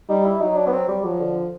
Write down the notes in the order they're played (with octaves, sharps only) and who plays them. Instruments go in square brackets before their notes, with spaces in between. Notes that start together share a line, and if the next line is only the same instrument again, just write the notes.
[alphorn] G3 [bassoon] D#4
[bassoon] E4
[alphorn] F#3 [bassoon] D#4
[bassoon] D4
B3
C4
G3
[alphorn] F3 [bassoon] F#3
[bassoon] D3